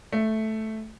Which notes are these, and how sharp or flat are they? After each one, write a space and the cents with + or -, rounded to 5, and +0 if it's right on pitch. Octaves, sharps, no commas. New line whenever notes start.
A3 -5